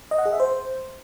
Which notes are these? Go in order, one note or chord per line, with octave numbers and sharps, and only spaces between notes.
D#5
F#5
G#4
E5
C5